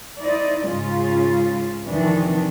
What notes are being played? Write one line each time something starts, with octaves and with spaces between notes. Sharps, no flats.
D#4 E4 C5 D5 D#5
G#2 C#3 C#4 F4
F2 C3 D#3 E3 D4